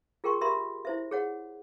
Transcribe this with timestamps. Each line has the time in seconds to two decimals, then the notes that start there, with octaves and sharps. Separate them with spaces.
0.24 F4 G#4 A#4 G5 C6 C#6
0.41 G4 A#4 E5 B5 C6
0.85 E4 C5 E5
1.11 G#4 C#5 F#5